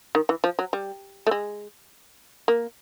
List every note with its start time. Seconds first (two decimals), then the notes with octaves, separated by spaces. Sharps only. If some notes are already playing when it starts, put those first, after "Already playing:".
0.15 D#3
0.29 E3
0.44 F3
0.59 F#3
0.73 G3
1.27 A3
1.31 G#3
2.48 A#3